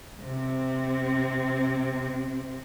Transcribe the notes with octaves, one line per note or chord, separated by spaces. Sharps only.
C3 C4